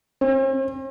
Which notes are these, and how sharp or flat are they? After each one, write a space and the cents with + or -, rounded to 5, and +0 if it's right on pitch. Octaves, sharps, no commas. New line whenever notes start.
C4 +45